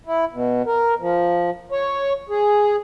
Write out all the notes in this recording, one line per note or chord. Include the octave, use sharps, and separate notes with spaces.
E4
B2
A#4
F3
C#5
G#4